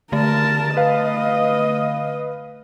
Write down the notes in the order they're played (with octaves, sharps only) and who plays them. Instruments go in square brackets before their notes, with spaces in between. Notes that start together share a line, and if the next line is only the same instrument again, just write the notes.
[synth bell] D3 A3 [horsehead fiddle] A#4 A5
[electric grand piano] B4 F5 [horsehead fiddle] D#5